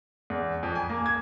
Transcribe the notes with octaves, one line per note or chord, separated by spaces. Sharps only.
E2
F2
G#5
A#3
G#6